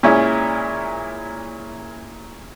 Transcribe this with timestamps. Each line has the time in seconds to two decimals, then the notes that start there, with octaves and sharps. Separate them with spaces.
0.03 A#2 G#3 C#4 E4